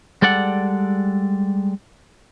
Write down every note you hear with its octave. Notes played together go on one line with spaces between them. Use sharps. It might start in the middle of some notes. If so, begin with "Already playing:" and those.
G3 G#3 A4 D5 F#5